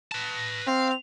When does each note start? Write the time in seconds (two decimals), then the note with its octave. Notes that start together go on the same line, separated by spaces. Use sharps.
0.12 B4 A5
0.67 C4 F5